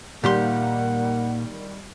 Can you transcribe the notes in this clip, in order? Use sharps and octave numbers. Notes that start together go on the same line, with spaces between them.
A#2 D#3 G3 A#3 G4 F#5 C6